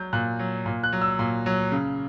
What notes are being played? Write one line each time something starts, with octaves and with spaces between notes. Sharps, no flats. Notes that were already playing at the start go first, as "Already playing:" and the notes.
Already playing: F#3 G6
A#2 F#6
F#3
A#2
F#6
F#3
E6
A#2
F#3
C#3